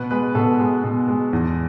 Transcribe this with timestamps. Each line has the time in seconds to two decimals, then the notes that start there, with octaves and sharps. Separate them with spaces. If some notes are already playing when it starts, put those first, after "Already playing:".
Already playing: B2 B4
0.11 G#3 B4
0.35 B2 A4
0.59 G#3
0.84 B2
1.08 G#3
1.33 E2